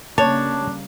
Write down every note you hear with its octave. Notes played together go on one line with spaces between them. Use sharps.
C#3 G3 A#3 D4 C#5 A5